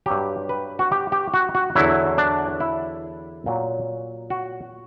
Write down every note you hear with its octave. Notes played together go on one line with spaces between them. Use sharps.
G2 F#3 G4
B4
F#4
G4
G4
F#4
F#4
E2 D3 F#3 E4
D4
E4
A#2 F#3
F#4